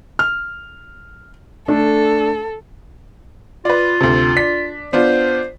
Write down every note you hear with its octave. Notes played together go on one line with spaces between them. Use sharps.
F6
A3 D4 A4
F4 B4 D5
D2 C3
D4 B6
B3 D4 F4 C5